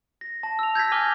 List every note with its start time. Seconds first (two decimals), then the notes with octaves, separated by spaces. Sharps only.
0.21 A#6
0.43 A5
0.59 E6 F7
0.75 G6 G#6 A#6 B6
0.92 G#5 D6 F6 G7